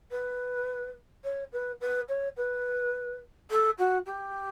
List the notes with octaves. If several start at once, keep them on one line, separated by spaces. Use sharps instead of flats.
B4
C#5
B4
B4
C#5
B4
A4
F#4
G4